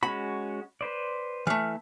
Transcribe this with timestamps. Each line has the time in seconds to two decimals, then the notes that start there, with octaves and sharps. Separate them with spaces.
0.03 G#3 C#4 F#4 B5
0.81 B4 C5 D5
1.47 E3 A3 F6